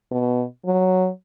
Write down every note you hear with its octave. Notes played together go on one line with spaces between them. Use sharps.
B2
F#3